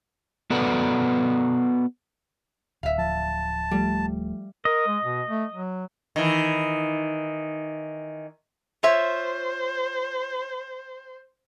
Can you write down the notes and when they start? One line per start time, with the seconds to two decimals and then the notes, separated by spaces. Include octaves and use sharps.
0.50 B3 F#4 A4 B4 D5 F#5
2.83 D1 E5 F5
2.98 F3 A5
3.71 F3 G3 A3
4.65 A#4 D#5
4.87 G#3
5.04 B2
5.29 A3
5.52 F#3
6.16 D#3 E3
8.83 F4 C5 C#5 E5